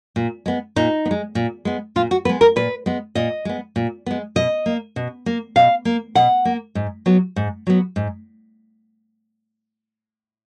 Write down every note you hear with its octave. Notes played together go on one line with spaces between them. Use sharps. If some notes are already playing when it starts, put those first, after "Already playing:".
A#2
G#3 B3
A#2 D#4
B3
G#3
A#2
G#3 B3
A#2 F4
F#4
G#3 B3 B4
A#4
A#2 B4
G#3 B3
A#2 D#5
G#3 B3
A#2
G#3 B3
B2 D#5
A#3
B2
A#3
B2 F5
A#3
B2 F#5
A#3
G#2
F#3 B3
G#2
F#3 B3
G#2